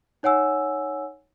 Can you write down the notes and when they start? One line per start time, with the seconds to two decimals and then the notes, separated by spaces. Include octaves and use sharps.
0.23 D#4 C#5 F#5 G#5 E6